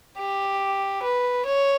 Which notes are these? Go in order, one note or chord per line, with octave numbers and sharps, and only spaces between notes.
G4
B4
C#5